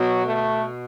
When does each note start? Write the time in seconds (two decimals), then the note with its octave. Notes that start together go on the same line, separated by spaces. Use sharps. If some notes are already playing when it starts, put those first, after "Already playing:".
Already playing: B2 F#3
0.25 A3